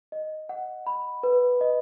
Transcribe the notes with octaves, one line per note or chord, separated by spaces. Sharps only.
D#5
F#5
B5
B4
D#5